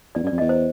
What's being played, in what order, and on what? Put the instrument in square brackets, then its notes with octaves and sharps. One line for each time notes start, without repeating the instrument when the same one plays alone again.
[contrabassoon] E2 [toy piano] D5
[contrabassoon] F#2
[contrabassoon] F2 [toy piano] D5
[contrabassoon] E2 [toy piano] D#5
[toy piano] C5